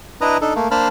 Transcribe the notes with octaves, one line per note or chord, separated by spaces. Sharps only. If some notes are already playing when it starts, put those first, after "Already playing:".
D4 E4 B4 D#5 A#5
D4 D#4 A4
A3 A#3
A#3 D4 C5 A5 B5 F6